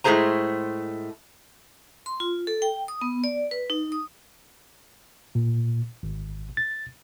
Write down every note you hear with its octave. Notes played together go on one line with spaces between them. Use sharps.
A2 G#3 A3 G#4 C5 A#5
C6
F4
A4
G5
D#6
B3
D5
B4
D#4
D#6
A#2
G#1
A6